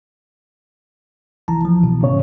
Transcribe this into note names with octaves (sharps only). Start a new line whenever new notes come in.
C2 E3 A5 A#5
F3
B2
G#2 C#3 C#5